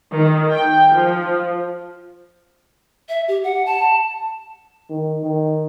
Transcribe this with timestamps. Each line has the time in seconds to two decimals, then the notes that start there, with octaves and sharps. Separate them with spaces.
0.14 D#3
0.52 G5
0.93 F3
3.09 E5
3.28 G4
3.44 F#5
3.66 A5
4.90 D#3
5.24 D#3